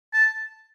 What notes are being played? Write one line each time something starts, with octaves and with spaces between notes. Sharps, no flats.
A5